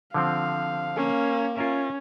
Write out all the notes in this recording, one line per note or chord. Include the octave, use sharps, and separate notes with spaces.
D3 F3 C4 F5
A#3 C#4
C#4 F4 A#4 E5